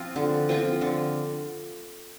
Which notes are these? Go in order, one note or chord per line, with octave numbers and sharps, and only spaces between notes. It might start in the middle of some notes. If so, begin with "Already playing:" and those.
Already playing: F3 C4 F4
D3
F3 C4 F4
D3